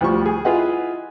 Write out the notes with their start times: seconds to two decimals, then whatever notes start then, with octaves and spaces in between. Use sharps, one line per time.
0.01 D2 F3 G3 C#6
0.26 G#4
0.45 E4 F4 G#4 B4 D#5 F#5